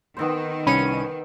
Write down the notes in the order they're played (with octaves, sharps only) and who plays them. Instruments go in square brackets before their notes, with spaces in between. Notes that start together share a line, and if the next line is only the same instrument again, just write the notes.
[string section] D#3 [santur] B3 C4 C5
[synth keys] C2 C#4 D#7 [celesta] B5 C#7